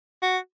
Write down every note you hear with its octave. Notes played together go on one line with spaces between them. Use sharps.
F#4